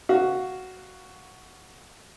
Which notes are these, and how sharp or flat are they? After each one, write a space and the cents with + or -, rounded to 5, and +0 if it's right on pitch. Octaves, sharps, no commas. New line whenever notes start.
F#4 +5 F5 +0